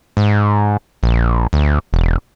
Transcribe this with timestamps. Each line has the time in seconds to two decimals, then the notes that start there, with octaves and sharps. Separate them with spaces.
0.17 G#2
1.03 A#1
1.53 D2
1.93 E1